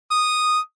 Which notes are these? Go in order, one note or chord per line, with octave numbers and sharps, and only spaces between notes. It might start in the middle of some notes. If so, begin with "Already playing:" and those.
D#6